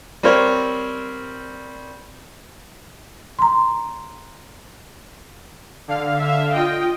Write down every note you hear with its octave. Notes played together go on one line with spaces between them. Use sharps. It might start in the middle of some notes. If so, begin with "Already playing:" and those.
G3 C4 A#4 C5 C#5
A#5 C6
D3 F5
E5
F4 D#5 G5